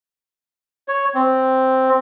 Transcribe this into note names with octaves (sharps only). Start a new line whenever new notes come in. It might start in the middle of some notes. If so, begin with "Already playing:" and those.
C#5
C4